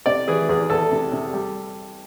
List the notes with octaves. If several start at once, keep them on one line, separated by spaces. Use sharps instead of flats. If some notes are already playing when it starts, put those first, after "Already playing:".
C3 D5
E3 G#4
E2 G#4
E2 A4
C3
C3
G3